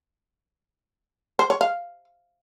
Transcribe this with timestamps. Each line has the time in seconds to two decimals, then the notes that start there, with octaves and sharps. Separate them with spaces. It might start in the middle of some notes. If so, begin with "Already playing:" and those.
1.39 C5
1.50 C#5
1.61 F5